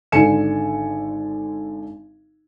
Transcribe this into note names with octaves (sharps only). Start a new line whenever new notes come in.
G#1 D3 A4 G#5 C#7 E7